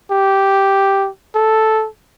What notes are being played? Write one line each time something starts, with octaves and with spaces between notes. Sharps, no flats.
G4
A4